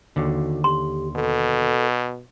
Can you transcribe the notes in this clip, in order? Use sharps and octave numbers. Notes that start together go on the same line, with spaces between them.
D#2 D3 F#4
G4 C6
B2 A4